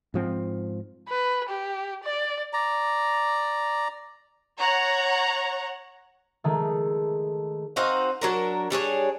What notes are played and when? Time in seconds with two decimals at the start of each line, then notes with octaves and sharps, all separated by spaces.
0.14 G#2 F3 C4
1.09 B4
1.49 G4
2.03 D5
2.53 D5 A#5
4.60 C#5 F#5 A#5
6.44 D#3 G#3 A3
7.76 C4 D#4 F#4 F5
8.21 F#3 D4 A#4
8.70 G3 D4 G#4 C#5